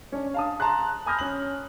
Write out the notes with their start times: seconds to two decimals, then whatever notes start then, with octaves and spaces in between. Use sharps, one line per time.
0.12 C#4 D4
0.34 F5 A5 D#6
0.60 A5 A#5 C6 F#6
1.06 G#5 B5 D#6 F6 G6 A#6
1.19 C#4 F#7